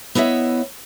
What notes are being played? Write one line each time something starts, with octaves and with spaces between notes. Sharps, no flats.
B3 E4 C#5 D#5 E5